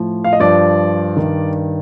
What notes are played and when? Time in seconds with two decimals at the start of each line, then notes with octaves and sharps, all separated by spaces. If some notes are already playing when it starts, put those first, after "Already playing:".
Already playing: A2 F3
0.24 F5
0.33 D#5
0.40 G2 F3 D5
1.17 G2 D#3